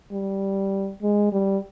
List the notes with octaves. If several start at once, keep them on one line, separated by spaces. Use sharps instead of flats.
G3
G#3
G3